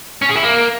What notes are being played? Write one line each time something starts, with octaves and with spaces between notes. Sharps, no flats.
C#4
G#4
E4
A#3